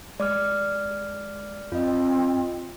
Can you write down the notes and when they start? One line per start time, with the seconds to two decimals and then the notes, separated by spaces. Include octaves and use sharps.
0.20 G#3 D5 D6 F6
1.72 F#2 C4 F4 D#5